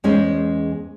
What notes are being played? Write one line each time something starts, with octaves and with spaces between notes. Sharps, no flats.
E2 G#3 C#4 G#4 C5